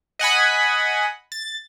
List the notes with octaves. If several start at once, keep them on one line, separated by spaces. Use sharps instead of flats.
D#5 F#5 G#5 B5
A6